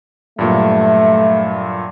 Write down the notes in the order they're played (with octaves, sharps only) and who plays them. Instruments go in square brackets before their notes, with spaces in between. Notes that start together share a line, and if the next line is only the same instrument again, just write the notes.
[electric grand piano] G2 A#2 F#3 [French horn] A3